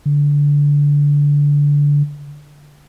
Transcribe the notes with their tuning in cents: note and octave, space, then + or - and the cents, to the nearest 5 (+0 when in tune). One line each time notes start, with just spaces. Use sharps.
D3 -20